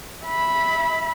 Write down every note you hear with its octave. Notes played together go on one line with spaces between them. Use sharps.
E5 B5